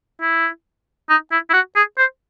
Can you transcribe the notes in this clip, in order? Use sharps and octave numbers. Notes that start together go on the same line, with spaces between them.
E4
D#4
E4
E4
F#4
G#4
C5